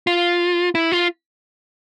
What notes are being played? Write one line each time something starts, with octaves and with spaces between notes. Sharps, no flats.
F4
E4
F4